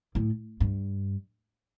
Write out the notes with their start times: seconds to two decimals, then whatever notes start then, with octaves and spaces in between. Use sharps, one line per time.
0.15 A2
0.60 G2